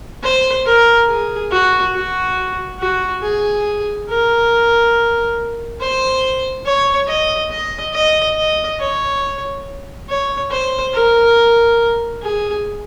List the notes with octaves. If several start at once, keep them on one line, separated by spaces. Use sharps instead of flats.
C5
A#4
G#4
F#4
F#4
F#4
G#4
A#4
C5
C#5
D#5
D#5
D#5
D#5
C#5
C#5
C5
A#4
G#4